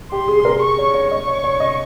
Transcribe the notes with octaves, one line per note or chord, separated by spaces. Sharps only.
G4 C6
G#4
G#4
A#4
C#6
C#5
C#5
C#5
D#5 C#6
C#5
C#5
D#5